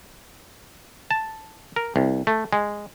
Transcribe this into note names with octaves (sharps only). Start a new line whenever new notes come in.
A5
A#4
C2
A3
G#3